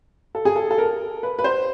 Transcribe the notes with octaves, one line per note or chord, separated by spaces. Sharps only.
A4
G#4
A4
A4
A#4
B4
B4
C5